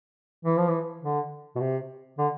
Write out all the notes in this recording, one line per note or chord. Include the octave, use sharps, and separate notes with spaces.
E3
F3
E3
D3
B2
C3
D3